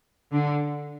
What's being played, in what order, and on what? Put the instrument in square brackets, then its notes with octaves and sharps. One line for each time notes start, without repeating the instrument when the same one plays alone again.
[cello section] D3